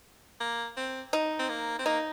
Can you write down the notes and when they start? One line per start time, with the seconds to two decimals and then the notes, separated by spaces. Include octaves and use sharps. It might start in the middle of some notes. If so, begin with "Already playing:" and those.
0.41 A#3
0.77 C4
1.13 D#4
1.40 C4
1.49 A#3
1.79 C4
1.86 A#3 D#4